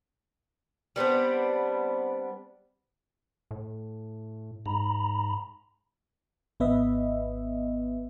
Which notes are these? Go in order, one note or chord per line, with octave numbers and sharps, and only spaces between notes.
G3 B3 C4 D4
A2
G#2 A#5 B5
G#1 B3 B4 D#5 E5